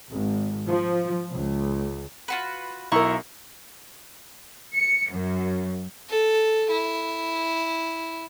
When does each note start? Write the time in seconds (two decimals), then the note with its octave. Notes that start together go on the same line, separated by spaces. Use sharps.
0.11 G#1
0.68 F3
1.33 C#2
2.28 F4 F#4 B4
2.92 B1 E4 A#4 A#5 C6 C#6
4.74 C#7
5.10 F#2
6.09 A4
6.71 E4